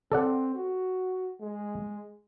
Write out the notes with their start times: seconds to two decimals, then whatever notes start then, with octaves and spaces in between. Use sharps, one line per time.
0.12 C4 A4 D5 F#5
0.55 F#4
1.40 G#3